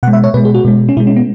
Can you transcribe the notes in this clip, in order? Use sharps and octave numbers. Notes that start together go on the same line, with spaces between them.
B2 G#3 F#5
E5
C#5
B2 G#3 B4
G#4
F#4
B2 G#3
C#4
B2 G#3 E4
C#4
B3